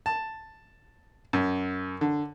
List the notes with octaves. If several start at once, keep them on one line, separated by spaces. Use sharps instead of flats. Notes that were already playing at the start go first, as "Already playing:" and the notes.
A5
F#2
D3